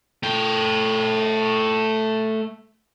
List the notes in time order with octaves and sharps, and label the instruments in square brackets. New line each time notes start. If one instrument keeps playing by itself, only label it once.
[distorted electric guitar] A3 G5